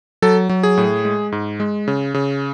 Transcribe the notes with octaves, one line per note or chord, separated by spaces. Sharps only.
F#3 A4
F#3
G#4
A2
G#3
G#2
G#3
C#3
C#3